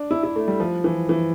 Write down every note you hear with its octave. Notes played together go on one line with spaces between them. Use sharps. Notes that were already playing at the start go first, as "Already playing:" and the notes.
Already playing: D4
E4
E4
A3
G3
F3
E3
E3